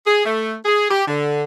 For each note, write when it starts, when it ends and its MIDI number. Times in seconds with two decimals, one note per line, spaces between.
0.07 0.25 68
0.25 0.55 57
0.65 0.90 68
0.90 1.02 67
1.08 1.44 50